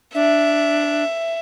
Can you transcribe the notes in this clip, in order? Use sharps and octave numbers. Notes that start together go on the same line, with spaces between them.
D4 E5